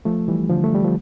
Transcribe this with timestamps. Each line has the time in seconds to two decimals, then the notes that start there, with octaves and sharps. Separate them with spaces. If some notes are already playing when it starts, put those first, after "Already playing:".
0.05 F3 A3
0.28 E3 G3
0.50 D3 F3
0.64 A3
0.75 G3
0.84 F3